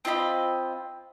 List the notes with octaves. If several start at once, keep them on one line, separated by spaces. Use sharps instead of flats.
C4 F4 D#5 B5